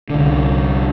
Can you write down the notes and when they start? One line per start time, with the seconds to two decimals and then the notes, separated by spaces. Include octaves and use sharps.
0.10 C2 D3